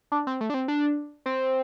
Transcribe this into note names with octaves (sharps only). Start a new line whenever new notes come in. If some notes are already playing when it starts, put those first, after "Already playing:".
D4
C4
A3
D4
C4
D4
C4